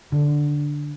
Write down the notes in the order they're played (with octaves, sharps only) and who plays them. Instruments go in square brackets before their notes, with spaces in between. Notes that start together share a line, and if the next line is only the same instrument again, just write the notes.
[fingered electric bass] D3